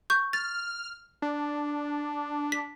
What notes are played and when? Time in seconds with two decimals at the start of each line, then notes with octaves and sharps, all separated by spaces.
0.10 C#6 G6
0.33 F6 A6
1.22 D4
2.52 B6